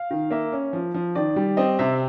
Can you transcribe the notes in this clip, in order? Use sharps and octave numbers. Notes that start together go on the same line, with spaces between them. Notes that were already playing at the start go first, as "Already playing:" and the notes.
Already playing: F5
D#3
A#3 E5
C#4
F3
F3
D#3 D5
G3
C4 D#5
C3 E5